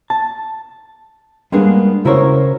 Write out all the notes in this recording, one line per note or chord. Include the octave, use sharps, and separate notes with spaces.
A5
G3 G#3 A#3 B3 D4 G#4
C#3 E4 F#4 A#4 C5 C#5